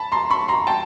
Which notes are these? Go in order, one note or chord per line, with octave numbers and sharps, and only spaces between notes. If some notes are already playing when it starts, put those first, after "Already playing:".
Already playing: A5 B5
A#5 C6
B5 C#6
A#5 C6
G5 A5